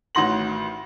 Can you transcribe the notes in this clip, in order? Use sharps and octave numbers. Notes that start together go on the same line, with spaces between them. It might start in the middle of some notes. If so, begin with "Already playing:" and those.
A1 D#3 F#4 C6 A#6 F#7